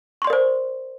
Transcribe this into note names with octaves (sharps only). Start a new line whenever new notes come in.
A#4 C5 D5 C6 C#6